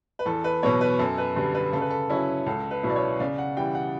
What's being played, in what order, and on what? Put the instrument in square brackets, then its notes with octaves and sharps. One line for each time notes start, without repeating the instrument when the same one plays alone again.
[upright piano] B4
E2 A4
B4
B2 F#3 B3 C#5
B4
F#2 A4
B4
D3 G3 B4
B4
C#3 A4
B4
A4
F#3 C#4 E4
C#2 A4
B4
B2 F#3 B3 E4
D5
C#5
C#3 D5
F#5
E3 G3 G5
F#5